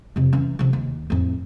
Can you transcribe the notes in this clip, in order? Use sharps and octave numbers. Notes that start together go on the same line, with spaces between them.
F2 C3
E3 C#4
C3 F3
D#2
F2 A2